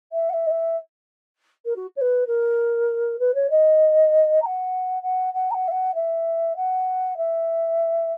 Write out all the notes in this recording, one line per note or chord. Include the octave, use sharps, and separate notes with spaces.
E5
F#5
E5
D#5
E5
A#4
F#4
C#5
B4
A#4
B4
C#5
D#5
A#5
F#5
F#5
F#5
A#5
F#5
E5
F#5
E5
F#5
E5